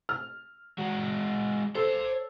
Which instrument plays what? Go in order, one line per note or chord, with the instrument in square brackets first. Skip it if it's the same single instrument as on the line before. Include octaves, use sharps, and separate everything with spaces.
[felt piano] F6
[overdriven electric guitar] G#3 F#4
[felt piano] A4 [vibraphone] C5 [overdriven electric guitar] C#5 C6